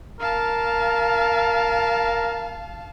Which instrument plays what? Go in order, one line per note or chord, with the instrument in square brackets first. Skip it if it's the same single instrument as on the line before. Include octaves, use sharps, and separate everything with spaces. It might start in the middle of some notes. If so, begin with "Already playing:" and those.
[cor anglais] A#4 [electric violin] F5 A5